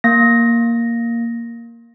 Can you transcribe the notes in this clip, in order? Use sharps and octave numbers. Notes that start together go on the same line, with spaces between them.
A#3 A#6